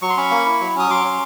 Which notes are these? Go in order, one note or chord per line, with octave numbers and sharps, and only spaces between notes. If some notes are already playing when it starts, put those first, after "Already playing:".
F#3 C#6
C6
C#4 B5 C#6
A#3
E4
F#3
C#4 D#6
F#3 C6 D6
C#4